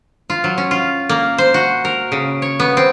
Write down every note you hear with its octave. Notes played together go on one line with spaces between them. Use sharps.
F4
F#3
C#4
F4
A#3
C5
F#4
A#4
C#3
C#5
B3
C4